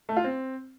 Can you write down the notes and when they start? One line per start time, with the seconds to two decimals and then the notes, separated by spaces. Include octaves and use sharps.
0.09 A3
0.17 F4
0.24 C4